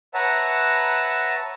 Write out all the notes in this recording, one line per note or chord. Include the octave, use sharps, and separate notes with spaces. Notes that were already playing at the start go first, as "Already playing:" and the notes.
B4 C#5 E5 F#5 A5 A#5